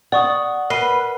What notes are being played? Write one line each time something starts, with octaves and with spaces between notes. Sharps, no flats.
D5 F#5 C#6 D#6
A#4 B4 C7 D#7